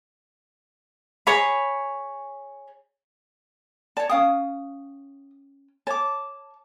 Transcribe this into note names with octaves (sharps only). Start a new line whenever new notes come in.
G#4 C#5 A#5 B5
C#5 D5 A5
C#4 F5 G5 D#6
C#5 A5 D6